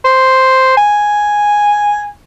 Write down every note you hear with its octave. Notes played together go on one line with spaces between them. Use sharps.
C5
G#5